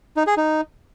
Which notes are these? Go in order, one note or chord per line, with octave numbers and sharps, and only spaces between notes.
D#4
G#4
D#4